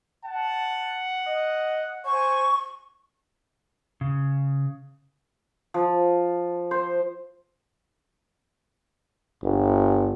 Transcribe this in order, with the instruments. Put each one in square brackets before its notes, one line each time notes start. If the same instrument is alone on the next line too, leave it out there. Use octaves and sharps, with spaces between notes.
[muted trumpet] F#5 [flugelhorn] A5
[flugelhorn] D#5
[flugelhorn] C5 [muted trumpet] G#5 [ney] C#6
[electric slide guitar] C#3
[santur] F3
C5
[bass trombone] G1